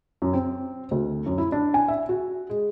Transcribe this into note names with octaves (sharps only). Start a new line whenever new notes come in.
F#2
C4
D2
F#2
E4
D4
G#5
E5
F#4
G#3